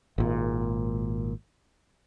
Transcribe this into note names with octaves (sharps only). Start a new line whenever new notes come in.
G#1 A#2